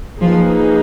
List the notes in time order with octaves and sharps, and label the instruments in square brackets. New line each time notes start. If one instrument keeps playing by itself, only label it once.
[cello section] F3 [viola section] A#3 D#4 G#4 B4